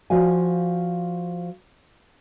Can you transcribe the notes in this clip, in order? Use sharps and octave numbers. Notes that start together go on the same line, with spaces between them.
F3 F#4 D5 F5 G#5